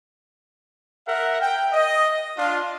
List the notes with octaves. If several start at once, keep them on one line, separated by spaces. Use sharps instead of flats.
A#4 E5 F#5
G5
D#5
D4 F4